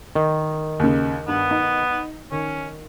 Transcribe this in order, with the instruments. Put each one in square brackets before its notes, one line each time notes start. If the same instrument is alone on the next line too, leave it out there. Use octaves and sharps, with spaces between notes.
[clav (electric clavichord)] D#3
[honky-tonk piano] D#2 C#3
[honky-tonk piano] G2 [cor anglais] B3
[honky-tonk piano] D#4
[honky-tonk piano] D#3 [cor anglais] C#4